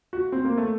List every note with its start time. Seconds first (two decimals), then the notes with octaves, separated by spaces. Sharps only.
0.13 F#4
0.32 C4
0.45 A#3
0.58 A3